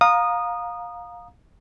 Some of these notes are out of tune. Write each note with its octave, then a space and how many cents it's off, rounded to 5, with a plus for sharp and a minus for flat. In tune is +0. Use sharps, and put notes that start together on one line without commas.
F5 +20 A#5 +10 D#6 -15